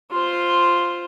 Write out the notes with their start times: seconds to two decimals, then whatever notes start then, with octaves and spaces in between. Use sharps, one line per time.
0.12 F4 C5